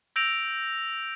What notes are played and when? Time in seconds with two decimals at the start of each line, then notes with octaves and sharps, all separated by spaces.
0.16 E6 G6 A#6 D7 F7